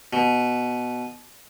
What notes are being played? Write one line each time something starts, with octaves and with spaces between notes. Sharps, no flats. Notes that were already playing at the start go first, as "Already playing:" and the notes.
B2